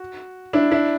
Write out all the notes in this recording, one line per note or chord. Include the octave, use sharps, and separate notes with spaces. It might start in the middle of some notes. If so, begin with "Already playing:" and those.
Already playing: F#4
D4 E4
D4 E4